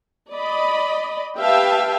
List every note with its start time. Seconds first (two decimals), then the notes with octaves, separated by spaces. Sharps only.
0.33 D5 D#5 B5
1.40 G4 B4 E5 F5 G5 A5